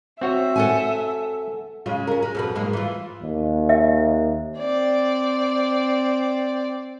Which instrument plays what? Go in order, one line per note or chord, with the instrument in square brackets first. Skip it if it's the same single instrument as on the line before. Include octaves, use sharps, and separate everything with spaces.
[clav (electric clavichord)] C4 F#4 C#5 [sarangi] E5
[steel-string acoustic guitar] A4 F#5 G#5
[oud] C#3 G#3 F4
C#4 A#4
G#3
F2 B2 B4
G#2 G#3 A#3
E3 F4
[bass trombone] D#2
[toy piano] E5
[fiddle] C4 D5